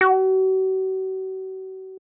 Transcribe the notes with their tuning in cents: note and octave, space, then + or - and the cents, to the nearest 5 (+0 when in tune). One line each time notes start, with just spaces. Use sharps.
F#4 +40